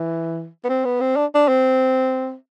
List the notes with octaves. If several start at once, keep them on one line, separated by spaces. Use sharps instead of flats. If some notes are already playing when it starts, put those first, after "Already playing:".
Already playing: E3
B3
C4
B3
C4
D4
D4
C4